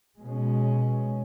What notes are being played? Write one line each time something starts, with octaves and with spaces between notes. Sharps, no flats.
B2 G#3 C#4